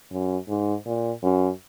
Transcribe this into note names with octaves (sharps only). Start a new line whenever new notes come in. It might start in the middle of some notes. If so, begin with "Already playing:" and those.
F#2
G#2
A#2
F#2